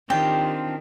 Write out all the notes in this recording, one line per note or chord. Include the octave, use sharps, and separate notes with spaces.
D#3 C4 D4 F4 G4 G5